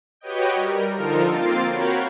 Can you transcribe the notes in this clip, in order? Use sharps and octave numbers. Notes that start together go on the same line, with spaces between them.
F#4 G4 B4 C#5 D#5 G5
G3 A#4
D3 F3 D#4 F4 A4 A#4
A#3 C4 F4 A6 C7 D7
F#4 A#4 C#5 F5 G5 B5